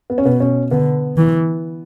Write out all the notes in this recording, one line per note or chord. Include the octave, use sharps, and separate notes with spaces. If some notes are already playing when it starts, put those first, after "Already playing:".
B3
C#4
B2 B3
C#4
D3 B3
E3